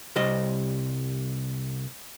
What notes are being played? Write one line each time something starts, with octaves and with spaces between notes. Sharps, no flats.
C2 G3 D#5